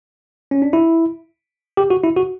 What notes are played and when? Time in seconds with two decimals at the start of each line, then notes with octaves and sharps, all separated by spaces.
0.51 C#4
0.62 D4
0.73 E4
1.77 G4
1.90 F#4
2.04 E4
2.16 F#4